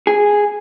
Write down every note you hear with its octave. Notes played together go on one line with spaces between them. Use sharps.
G#4